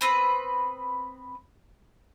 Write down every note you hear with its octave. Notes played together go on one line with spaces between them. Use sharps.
B3 C4 B4